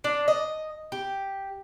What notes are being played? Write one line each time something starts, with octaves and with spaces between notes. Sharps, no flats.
D4
D#5
G4